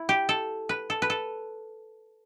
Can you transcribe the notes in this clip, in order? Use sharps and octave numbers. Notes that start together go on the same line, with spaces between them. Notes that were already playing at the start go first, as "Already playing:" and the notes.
Already playing: E4
G4
A4
B4
A4
B4
A4